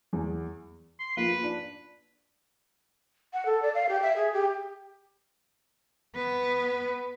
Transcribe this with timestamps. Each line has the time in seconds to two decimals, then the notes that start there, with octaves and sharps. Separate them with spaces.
0.13 E2
1.00 C6
1.17 F3 A#3 B4
1.30 F4
1.43 D4
3.33 F#5
3.46 A4
3.62 D5
3.74 F5
3.89 G4
4.02 E5
4.16 G#4
4.33 G4
6.16 B3 B4